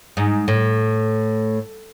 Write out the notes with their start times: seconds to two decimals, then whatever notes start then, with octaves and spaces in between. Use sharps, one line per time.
0.17 G#2
0.48 A2